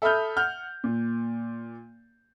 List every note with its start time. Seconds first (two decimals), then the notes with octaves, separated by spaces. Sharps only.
0.02 A4 E5 B5 D#6 F6 G6
0.37 F#5 F6 G6
0.84 A#2